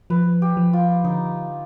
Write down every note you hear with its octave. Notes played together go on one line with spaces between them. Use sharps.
F3 B4
G4
F3
F4
D3 D#4